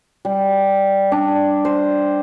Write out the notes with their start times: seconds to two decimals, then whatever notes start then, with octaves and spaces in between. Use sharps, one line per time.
0.25 G3
1.12 D4
1.65 C5